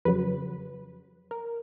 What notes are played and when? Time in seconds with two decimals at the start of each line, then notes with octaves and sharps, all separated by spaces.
0.05 F2 C#3 F#3 B4
1.31 A#4